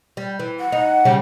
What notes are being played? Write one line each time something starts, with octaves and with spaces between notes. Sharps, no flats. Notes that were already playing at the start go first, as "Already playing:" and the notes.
G3
E3
F#5
D#4
C#3 G3 C#4